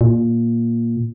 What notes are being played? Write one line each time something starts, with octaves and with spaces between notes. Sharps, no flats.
A#2